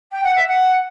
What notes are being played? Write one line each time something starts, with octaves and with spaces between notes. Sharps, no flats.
G5
F#5
E5
F#5